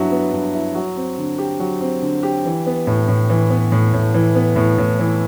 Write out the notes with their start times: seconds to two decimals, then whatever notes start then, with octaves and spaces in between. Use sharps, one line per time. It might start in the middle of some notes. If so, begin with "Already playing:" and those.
Already playing: G2 F#3 B3 E4
0.11 B3
0.32 G2
0.54 E4
0.75 F#3
0.97 C4
1.18 D3
1.38 G4
1.60 F#3
1.81 C4
2.02 D3
2.23 G4
2.45 E3
2.66 B3
2.87 A2
3.08 A2
3.30 E3
3.50 B3
3.72 A2
3.93 A2
4.14 E3
4.35 B3
4.56 A2
4.78 A2
4.99 E3